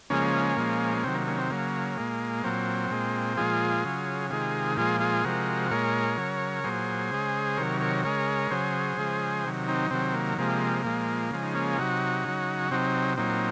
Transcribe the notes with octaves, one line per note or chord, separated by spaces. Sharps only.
C#3 F3 G#3 A#3 C#4
A#2 F3 G#3
A#3
C3 D#3 F#3 C4
A#3
A#3 C#4
C4
C#3 F#3 A#3
A#2 G#3
A#2 F#3 C4
A#2 G#3
A#2 F3 G#3 F4 G#4
C#3 F#3
C3 D#3 G#3 F4 G#4
A#2 F3 G#3 F4 G#4
F4 G#4
C3 F3 G#3 F#4 A#4
A#2 G#3 A#4 C#5
C#3 F#3
A#2 F#3 G#4 C5
C#3 G#3
C3 D#3 F#3 A#4 C#5
A#4 C#5
C#3 G#3 A#4 C#5
C#3 F#3 G#4 C5
C#3 F3 G#3
C3 D#3 F#3
C4 D#4
C3 D#3 F#3 C4
A#3
C3 F3 G#3 A#3
A#2 F3 G#3
C#3 F3 G#3
D#4
A#3 C#4
C3 F#3 D#4 F#4
C#3 F#3
C3 F#3 C4 D#4
A#2 F#3 C4 D#4